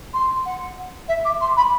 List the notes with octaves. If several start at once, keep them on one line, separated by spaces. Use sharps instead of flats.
C6
F#5
E5
D6
C6
B5